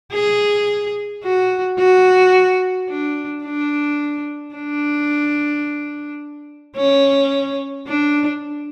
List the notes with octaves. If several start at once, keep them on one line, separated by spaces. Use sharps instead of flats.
G#4
F#4
F#4
D4
D4
D4
C#4
D4